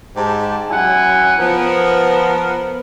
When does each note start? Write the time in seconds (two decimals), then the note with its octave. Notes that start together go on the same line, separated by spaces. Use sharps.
0.16 G#2 G4 A5
0.70 F#2 F#3 E4 F#5 G#5
1.40 F3 B3 A#4